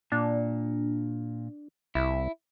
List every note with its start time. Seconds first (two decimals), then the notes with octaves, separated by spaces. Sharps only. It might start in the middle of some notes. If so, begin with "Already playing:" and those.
0.12 A#2 D4
1.95 C2 E4